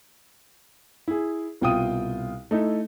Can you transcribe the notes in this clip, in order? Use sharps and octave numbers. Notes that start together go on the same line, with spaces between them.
E4 G#4
C2 B2 F4 G5 D#6 D#7
A3 D#4 E4